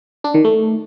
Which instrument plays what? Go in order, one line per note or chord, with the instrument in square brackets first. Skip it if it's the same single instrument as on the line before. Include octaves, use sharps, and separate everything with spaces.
[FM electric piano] D4
D#3
A3